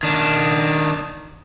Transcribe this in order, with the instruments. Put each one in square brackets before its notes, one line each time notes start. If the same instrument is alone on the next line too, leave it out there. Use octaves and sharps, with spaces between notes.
[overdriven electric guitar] D#3 D4